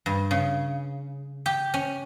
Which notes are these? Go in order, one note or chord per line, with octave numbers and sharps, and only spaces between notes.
G2
C#3
G4
C#4